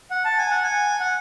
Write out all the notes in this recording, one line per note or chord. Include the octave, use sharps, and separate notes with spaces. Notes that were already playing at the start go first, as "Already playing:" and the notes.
F#5
A5
G#5
F#5
G#5
F#5